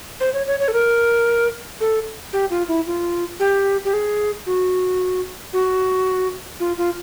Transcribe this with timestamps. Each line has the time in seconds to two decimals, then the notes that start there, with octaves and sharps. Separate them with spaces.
0.20 C5
0.33 C#5
0.47 C#5
0.60 C#5
0.68 A4
0.73 A#4
1.81 A4
2.33 G4
2.50 F4
2.68 E4
2.87 F4
3.40 G4
3.85 G4
3.93 G#4
4.46 F#4
5.53 F#4
6.60 F4
6.77 F4